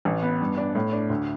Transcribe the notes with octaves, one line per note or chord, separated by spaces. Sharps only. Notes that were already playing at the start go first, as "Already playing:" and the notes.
A1
B3
G2
D4
A2
D4
D2